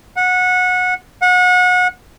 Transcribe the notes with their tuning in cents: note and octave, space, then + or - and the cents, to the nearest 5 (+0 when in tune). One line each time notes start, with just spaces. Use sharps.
F#5 -20
F#5 -30